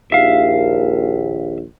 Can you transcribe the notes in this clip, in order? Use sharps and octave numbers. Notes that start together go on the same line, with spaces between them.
A#1 D#2 E5 F5